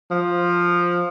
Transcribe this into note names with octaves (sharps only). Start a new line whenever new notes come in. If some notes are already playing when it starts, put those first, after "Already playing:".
F3